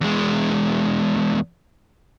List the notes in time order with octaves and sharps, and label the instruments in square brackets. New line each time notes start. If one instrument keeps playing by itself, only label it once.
[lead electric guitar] E2 G#3